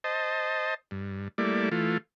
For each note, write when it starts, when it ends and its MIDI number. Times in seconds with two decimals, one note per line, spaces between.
0.04 0.74 72
0.04 0.74 75
0.04 0.74 81
0.91 1.28 43
1.38 1.69 55
1.38 1.69 57
1.38 1.69 58
1.38 1.69 64
1.38 1.69 74
1.72 1.98 52
1.72 1.98 57
1.72 1.98 65